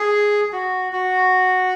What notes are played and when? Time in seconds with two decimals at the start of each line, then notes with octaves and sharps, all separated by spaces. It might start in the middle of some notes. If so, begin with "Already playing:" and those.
Already playing: G#4
0.52 F#4
0.92 F#4